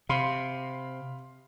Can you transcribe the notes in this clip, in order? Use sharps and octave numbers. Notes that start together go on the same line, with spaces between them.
C3 F5 B5 C6